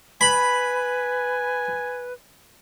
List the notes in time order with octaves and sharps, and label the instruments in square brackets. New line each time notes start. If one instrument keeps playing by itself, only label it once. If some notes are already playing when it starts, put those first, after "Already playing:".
[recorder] B4 [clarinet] G#5 [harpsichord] B5